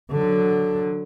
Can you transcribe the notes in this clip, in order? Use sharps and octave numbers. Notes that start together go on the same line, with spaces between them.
D3 F#3